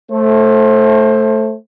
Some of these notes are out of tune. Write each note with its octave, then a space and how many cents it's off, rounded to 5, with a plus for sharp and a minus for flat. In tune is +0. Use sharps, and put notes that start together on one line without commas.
A3 +0 C5 +25